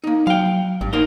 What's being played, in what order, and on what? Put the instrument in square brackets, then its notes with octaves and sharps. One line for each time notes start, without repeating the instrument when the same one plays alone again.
[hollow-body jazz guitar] A#3 D#4
[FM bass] F#3 [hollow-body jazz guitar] F5 G5
[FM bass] G#1 [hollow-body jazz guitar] G2
[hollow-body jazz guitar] A#3 D#4 C5